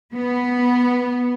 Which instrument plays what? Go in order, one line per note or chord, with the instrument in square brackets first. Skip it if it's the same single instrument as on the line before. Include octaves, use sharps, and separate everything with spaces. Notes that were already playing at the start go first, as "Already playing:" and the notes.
[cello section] B3